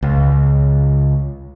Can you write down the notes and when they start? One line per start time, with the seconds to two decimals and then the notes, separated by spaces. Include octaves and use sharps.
0.02 C#2